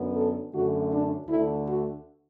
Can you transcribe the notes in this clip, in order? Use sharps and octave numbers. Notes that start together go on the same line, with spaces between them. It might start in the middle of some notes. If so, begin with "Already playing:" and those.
Already playing: F#2 D3 B3
A4
F#2 D3 A3 F#4
D4
D2 D3 A3 E4
F#4